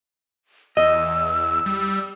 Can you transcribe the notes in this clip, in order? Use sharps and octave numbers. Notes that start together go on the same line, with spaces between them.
E2 D#5 E6
G3